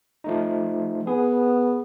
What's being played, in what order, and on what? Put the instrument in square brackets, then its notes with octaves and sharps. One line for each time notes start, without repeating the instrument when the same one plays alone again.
[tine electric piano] F3 A3 D#4
[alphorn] B3 [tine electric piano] G#4